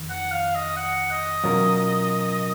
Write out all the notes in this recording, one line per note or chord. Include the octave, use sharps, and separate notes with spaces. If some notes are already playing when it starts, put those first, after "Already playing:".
Already playing: F2 D#3
F#5
F5
D#5
F#5
D#5
B2 F#3 C#4 F4 A#4